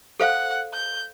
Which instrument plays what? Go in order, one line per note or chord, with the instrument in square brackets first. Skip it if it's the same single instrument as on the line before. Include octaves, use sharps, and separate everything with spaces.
[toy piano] A4 C5 F5 [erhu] F#5
[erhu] G6